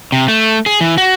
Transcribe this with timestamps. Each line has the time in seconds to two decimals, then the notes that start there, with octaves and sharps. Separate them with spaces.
0.12 C3
0.28 A3
0.66 G#4
0.81 E3
0.98 F#4